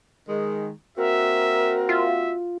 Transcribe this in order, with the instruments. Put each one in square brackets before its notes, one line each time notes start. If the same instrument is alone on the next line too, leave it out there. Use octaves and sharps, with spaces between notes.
[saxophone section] D#3 G#3
[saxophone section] A#3 C4 F#4 [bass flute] A#4 [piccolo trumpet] E5
[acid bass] F4 [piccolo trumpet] E5